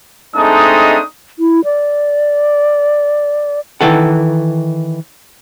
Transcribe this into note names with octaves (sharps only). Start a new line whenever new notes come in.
G#3 A3 C4 D4 D#4 D#6
E4
D5
D#3 E3 A4 F#5